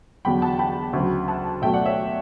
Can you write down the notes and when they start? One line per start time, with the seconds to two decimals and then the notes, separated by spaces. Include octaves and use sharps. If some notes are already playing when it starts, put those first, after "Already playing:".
0.25 E2 D3 F#3 G5 B5
0.42 F#5 A5
0.59 G5 B5
0.93 D2 C#3 F#3
1.28 F#5 A5
1.62 B2 F#3 A3 E5 G5
1.73 D5 F#5
1.86 C#5 E5